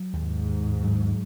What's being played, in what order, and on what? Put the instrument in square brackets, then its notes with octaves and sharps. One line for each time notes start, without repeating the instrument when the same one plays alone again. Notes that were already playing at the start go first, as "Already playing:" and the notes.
Already playing: [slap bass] F#3
[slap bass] D#2 [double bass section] G#2
[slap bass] D#2
F#3